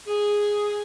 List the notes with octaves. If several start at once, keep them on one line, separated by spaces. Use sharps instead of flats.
G#4